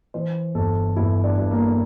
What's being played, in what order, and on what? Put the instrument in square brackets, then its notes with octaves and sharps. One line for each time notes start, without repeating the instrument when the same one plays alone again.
[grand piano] E3 C5
G1 A4
G1 E4
D4
G2
A#3